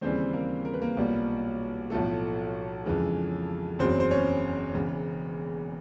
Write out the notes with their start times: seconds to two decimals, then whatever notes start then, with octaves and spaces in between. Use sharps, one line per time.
0.01 D#2 C#3 E3 G3 C4 C5
0.33 A#3 A#4
0.65 A#4
0.74 B4
0.82 A#3 A#4
0.97 B1 A#2 G3
1.90 B1 A2 F3 A3 A4
2.85 F2 C#3 E3 G#3
3.79 F#1 E2 C#3 F#3 C4 C5
4.00 C5
4.11 C#4 C#5
4.74 E1 E2 C#3